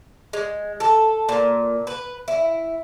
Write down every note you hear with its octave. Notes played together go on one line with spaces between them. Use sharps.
G#3
A4
A#2
B4
E4